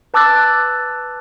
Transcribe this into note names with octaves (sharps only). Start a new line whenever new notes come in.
B4 A5 D6 E6 F#6 A6